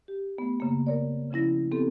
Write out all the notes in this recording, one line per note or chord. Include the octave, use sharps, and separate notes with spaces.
G4
A3 B3
F#2 C#3 A#3
A#4 C#5 D5
C#3 F3 C#4 E4 A#6
B3 C4 G4 A4